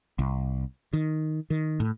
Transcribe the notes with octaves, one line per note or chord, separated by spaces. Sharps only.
C2
D#3
D#3
A2